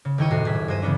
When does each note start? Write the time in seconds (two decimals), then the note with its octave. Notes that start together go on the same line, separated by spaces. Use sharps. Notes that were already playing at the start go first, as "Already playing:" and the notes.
0.05 C#3
0.18 D#1 D#3 E4 G5 C#6 D#7
0.30 F#2 A2 C3 F#4 A#5 C7
0.45 D#1 G#4 B6
0.68 G2 G#3 C5 A#5 D#7
0.82 C#3 E3 B3 C#4 D4